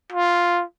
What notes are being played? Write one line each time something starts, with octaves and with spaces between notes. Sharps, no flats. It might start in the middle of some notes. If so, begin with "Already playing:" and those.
F4